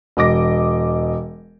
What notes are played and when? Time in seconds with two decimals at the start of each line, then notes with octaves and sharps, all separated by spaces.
0.17 E1 D#5 D6 A#6